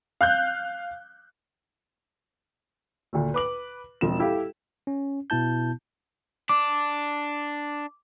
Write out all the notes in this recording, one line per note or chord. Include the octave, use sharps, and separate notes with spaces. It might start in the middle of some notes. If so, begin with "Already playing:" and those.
F5 F#6 G6
D2 A#2 A3
B4 D6 F#7
E1 F3 C4 E7
E4 G4 A4 F5
C#4
B2 B3 E4 A5 G6
D4 D6